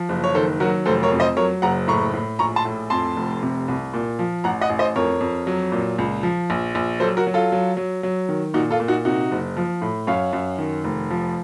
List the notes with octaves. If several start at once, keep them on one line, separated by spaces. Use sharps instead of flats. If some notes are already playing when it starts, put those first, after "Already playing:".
Already playing: F3
F#1
C#5
D#3 A4 C5
F#3 F#4 A#4
F1 A4 C5
A#4 C#5
F2
C5 D#5
F#3 A#4 C#5
F#1 F#5 A#5
A2 A#5 C#6
A2
A#1 A#5 C#6
A5 C6
A2
F2 A5 C6
F1
C3
C2
A#2
F3
A1 F#5 A#5
D#5 F#5
A1
C5 D#5
F2 A#4 C#5
F2
F#3
A#2
C#2
F3
A#1
A#1
F#3 A4 C5
F#4 A#4
F#3
F4 A4
F#3
F#3
F#3
D#3
A#2 D#4 F#4
F4 A4
A#2
D#4 F#4
C3 D#4 F#4
F#1
F3
A2
F#2 C#5 F5
F#2
D#3
F1
F3